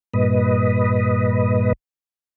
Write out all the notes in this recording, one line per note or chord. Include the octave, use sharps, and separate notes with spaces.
G2 A#2 B4 D#5